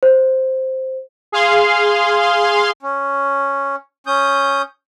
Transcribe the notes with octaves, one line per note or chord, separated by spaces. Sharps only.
C5
G#4 F5 C6
C#4
C#4 D#6 G6